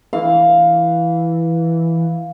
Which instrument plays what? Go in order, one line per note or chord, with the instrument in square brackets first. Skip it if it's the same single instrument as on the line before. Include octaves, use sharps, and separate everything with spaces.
[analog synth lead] E3 [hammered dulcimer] F5